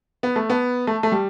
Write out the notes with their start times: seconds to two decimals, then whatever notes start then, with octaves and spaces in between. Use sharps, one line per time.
0.23 B3
0.36 A3
0.50 B3
0.87 A3
1.03 A3
1.12 G3